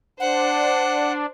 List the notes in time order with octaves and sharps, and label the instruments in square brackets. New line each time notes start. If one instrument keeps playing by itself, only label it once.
[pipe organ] D4 [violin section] C5 D5 [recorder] F#5